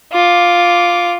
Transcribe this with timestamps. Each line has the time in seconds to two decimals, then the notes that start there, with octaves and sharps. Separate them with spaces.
0.12 F4 D6